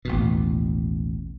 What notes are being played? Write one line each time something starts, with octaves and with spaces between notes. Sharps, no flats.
A1 D#2 B2